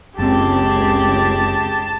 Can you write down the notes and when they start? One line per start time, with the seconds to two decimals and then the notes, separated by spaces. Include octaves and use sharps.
0.18 F#1 C#2 C4 G4 G#4 A5